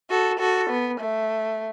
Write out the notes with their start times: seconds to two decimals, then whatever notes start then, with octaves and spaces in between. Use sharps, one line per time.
0.10 F#4 A4
0.39 F#4 A4
0.69 B3
1.00 A3